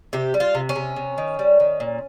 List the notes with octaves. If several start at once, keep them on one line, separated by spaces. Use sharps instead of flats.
C3 G4
G3
F4
C3
C#4
C3
C3
D#3
G3
D#3
A#2